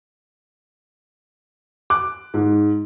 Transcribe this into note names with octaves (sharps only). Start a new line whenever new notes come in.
D6 F#6
G#2